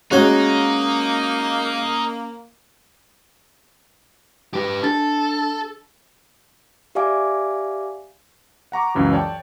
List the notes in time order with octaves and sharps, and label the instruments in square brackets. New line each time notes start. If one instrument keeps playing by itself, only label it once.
[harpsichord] G#3 F#4 G#5 [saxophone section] A#3 [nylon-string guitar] C#4 C#5 [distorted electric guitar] D#4
[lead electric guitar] G4 B4
[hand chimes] D4 A6 [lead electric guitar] A4
[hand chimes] G4 D5 E5 F5 G#5 D6
[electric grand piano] F#5 A#5 C#6 D6
C#2 F#2 E3 F#3
C#5 D5 G5 A5